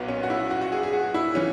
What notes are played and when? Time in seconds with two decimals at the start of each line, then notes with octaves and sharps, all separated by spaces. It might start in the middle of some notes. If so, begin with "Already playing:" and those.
Already playing: B1 A#2 F#3 B3
0.08 C#4
0.23 F#4
0.30 E4
0.51 F#4
0.61 F#4
0.72 G#4
0.83 G#4
0.93 F#4
1.14 E4
1.35 E3 C#4